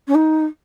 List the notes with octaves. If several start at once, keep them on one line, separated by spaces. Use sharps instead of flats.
C#4
D#4